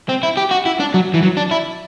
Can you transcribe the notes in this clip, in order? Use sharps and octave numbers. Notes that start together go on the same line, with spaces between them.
C4
E4
G4
F#4
E4
D4
F#3
E3
F#3
D4
E4